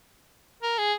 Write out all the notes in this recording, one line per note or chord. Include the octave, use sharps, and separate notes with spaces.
A#4
G#4